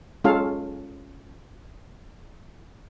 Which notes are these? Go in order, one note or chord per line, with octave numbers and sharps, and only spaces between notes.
G#3 C#4 F4 A4 F5